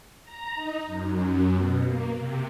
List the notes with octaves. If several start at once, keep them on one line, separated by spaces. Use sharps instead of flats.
A#5
D#4
F#2
B2
A#3
C3